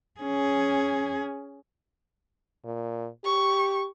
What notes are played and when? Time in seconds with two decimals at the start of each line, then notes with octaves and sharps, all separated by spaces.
0.21 C#4 G#4
2.64 A#2
3.24 G4 C#6